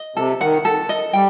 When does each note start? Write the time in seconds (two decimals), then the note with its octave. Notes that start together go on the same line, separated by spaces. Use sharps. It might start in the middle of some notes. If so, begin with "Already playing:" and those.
Already playing: D#5
0.16 C3 A4
0.41 D#3 F#5
0.65 A4
0.89 D#5
1.13 G3 G5